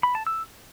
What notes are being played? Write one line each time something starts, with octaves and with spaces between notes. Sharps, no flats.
B5
A5
E6